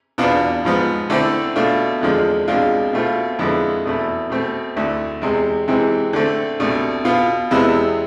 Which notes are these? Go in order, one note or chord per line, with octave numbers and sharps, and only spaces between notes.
E2 B2 B3 D4 F4
G#2 F3 B3
D3 A3 C4 E4
B2 A3 D4 F4
E2 D3 F3 G#3
C2 B2 G#3 D4 F4
B2 A3 C4 F4
F2 D3 G#3 B3 E4
E2 B2 A3 E4
B2 A3 C4
D2 D3 A3 E4
E2 C3 G#3
C3 E3 G#3 C4
D3 A3 C4
C2 B2 A3 D4
B2 B3 F4
E2 C3 G#3 B3 E4